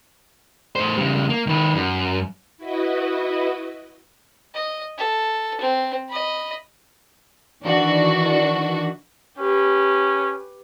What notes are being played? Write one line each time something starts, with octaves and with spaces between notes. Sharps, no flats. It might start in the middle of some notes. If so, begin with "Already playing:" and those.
A2 C5
C#3 G3
A#3
D#3 B4
F#2
E4 F#4 B4 D#5
D#5
A4
C4
D#5 B5
D#3 E3 D4 F#4
C#4 G4 B4